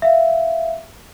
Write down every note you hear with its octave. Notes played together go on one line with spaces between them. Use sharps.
E5 F5